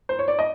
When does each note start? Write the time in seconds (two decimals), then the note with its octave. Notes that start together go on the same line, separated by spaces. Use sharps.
0.09 C5
0.19 C#5
0.28 D5
0.39 D#5